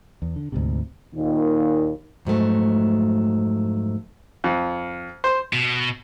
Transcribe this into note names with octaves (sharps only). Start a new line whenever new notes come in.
E2
D3
D2 G#2 C3
D#2 A#2 D#3
F2 G#2 F#3 A3
F2
C5
B2